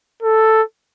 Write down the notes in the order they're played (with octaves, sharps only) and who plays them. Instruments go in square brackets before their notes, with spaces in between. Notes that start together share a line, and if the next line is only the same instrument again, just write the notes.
[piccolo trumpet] A4